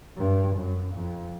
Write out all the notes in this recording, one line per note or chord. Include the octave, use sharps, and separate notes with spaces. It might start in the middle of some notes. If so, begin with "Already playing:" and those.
G2
F#2
F2